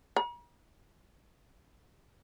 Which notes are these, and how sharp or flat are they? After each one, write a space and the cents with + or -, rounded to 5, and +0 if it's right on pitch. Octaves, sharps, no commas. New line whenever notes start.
A#5 +45